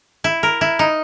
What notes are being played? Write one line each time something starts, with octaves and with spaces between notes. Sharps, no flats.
E4
A#4
E4
D#4